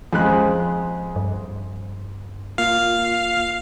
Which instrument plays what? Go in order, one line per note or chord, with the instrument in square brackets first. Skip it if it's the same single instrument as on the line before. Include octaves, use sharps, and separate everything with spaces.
[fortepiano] F2 G#3 F#6 [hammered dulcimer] G#4 C5
[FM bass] G2
[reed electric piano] A#3 F4 [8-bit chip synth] F5